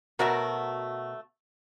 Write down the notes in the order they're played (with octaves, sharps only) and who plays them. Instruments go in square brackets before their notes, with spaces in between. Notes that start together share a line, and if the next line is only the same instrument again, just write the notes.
[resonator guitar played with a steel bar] B2 F#4 A#4 [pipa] F#3 A3 E5